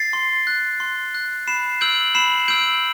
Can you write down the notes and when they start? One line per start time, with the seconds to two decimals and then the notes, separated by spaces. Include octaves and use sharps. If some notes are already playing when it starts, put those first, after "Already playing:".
Already playing: A6 C7
0.13 C6
0.47 F#6
0.80 C6
1.15 F#6
1.47 B5 C7 E7
1.81 E6 G6 D7 F#7
2.15 B5 C7 E7
2.48 E6 G6 D7 F#7